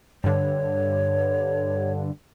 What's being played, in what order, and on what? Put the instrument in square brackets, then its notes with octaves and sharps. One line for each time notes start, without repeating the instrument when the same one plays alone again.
[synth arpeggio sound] G2 D3 [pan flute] C#5